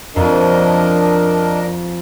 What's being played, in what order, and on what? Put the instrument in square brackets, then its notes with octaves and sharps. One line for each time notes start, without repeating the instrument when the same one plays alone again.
[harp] F2 [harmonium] D4 A#4 D#5